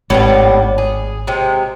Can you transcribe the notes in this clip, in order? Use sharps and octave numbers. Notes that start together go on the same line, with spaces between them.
G#1 A2 G3 B3
G#4
C3 G#3